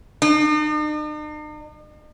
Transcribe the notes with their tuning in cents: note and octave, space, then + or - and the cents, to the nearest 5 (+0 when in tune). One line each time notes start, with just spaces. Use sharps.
D#4 -45